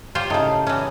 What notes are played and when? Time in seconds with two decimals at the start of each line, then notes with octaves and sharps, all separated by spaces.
0.15 F4 G4 C5 C#5 G5
0.30 A2 C#3 D#4 A5
0.67 E3 C#4